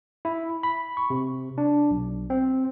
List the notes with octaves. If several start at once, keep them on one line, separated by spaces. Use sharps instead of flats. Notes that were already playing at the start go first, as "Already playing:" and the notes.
E4
B5
C#6
C3
D4
B1
C4